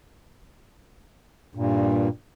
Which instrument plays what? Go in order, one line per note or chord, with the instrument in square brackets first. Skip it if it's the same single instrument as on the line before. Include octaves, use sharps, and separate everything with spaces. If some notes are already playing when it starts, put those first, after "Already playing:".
[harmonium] G2 A#2